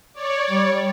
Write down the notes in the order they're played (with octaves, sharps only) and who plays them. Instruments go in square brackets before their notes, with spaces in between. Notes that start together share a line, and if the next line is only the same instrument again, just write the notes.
[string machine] C#5 D5
[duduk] G3